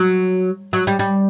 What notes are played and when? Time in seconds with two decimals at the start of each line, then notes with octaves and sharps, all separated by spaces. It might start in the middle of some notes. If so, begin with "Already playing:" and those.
Already playing: F#3
0.73 F#3
0.87 G3
0.99 G3